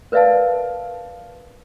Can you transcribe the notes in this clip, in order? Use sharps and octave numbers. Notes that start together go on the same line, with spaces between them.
A#4 B4 D5 E5 F5 A5